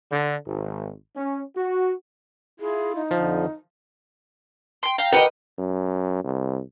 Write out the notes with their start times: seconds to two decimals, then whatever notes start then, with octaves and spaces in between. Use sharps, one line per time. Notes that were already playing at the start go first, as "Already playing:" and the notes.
0.11 D3
0.46 G#1
1.17 C#4
1.57 F#4
2.60 E4 F4 G#4
2.96 D#4
3.11 F2 D3 F3
4.83 G5 C6
4.98 F5 G5 A#5
5.13 G4 A#4 B4 D#5 F#5 G5
5.59 F#2
6.24 C2